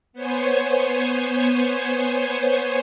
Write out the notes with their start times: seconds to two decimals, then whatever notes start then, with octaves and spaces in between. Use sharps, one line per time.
0.13 B3 C5 C#5 G#5